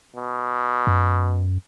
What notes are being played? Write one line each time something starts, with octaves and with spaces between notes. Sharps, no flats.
B2
F#2